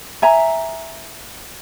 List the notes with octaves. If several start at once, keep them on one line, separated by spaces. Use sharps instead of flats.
E5 G#5 A#5